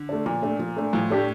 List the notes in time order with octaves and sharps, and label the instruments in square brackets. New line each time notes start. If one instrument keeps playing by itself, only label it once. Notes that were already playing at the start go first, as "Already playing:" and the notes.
Already playing: [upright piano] D3
[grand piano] A3 D4
[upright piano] A#2 [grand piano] F3
[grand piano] A3 D4
F3
A3 D4
[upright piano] A2 [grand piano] F3
[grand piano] A3 D4 G4